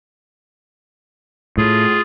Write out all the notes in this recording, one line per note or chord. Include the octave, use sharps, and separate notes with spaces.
A2 F4 G#4